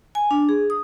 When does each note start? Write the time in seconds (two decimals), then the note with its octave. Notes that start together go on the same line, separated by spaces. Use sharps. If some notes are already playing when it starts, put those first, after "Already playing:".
0.15 G#5
0.31 D4
0.49 G#4
0.70 D#6